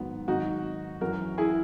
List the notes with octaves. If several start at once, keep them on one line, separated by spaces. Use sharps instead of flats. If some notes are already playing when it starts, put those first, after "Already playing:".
Already playing: G#2 D#3 F#3 B3
G#2 D#3 F#3 D#4 F#4
F#2 E3 F#4 A#4
E4 G#4